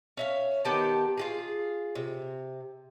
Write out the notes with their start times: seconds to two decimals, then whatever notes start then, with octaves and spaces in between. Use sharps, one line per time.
0.17 C#4 E5 F5
0.65 D#3 B3 G4 A5
1.18 F4 G4 G#4
1.95 C3